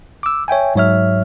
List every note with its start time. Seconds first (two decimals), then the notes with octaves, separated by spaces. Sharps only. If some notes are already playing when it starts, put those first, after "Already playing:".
0.23 D6 E6
0.48 C#5 E5 G5 G#5
0.76 G#2 F#3 C#5 E5 F6